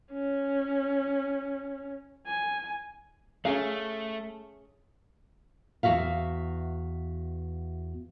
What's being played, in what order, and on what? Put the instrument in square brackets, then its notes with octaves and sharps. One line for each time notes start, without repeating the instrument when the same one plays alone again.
[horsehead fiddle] C#4
G#5
[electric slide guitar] A3 [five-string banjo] C#4 G#4 F5
[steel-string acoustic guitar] E2 G2 F#4 E5 F5